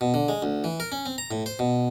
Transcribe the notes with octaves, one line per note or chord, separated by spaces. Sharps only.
B2
D3
G#3
D2
E3
A#4
C#4
C4
A#5
A2
C5
B2